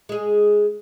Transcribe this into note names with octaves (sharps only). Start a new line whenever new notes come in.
G#3 G#4